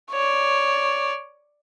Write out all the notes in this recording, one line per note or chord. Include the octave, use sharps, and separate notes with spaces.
C#5 D5